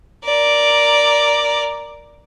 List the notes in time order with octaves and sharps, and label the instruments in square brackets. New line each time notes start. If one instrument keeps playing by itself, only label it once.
[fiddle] A#4 D5